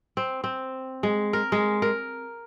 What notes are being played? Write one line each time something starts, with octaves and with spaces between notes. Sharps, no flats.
C4
C4
G#3
A#4
G#3
A#4